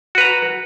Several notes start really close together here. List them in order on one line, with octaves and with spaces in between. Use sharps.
F#4 B4 A#5